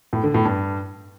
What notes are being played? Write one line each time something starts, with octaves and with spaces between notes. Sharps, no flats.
A2
D3
A2
G2